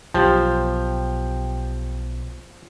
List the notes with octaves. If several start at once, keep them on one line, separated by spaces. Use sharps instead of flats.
B1 F3 G4